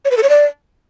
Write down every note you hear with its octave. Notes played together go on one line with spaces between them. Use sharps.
C#5
B4
A4
C#5
D5